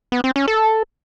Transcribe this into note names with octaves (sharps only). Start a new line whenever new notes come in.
B3
C4
C#4
A4